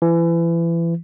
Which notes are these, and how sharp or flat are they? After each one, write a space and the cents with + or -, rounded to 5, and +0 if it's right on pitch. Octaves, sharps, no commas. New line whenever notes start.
E3 +30